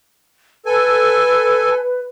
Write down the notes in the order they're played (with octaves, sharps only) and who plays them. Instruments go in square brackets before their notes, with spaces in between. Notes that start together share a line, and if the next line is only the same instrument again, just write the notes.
[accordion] A4 G#5 [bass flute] B4